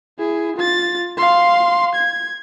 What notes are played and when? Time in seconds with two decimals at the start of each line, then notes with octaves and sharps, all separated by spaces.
0.18 E4 G#4
0.56 F4 A6
1.17 F5 C6
1.95 G#6